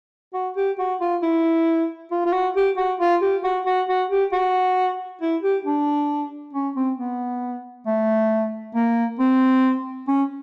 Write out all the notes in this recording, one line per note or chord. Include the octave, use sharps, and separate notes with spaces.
F#4
G4
F#4
F4
E4
F4
F4
F#4
G4
F#4
F4
G4
F#4
F#4
F#4
G4
F#4
E4
G4
D4
C#4
C4
B3
A3
A#3
C4
C#4